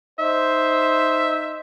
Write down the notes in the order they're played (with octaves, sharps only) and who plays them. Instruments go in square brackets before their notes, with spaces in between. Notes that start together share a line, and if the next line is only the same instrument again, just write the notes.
[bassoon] D#4 [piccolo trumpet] C5 [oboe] E5